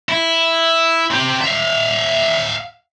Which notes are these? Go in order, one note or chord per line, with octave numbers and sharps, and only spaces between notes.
E4
C4 G4
E5 F5